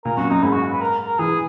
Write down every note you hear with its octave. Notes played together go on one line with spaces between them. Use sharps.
A#2 A#4
F#2 F#4
F#2 D#4
G#2 E4
F#4
B4
A#4
A#4
E3 G#4